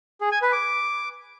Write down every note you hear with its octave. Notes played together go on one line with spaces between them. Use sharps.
G#4
G#5
B4
D6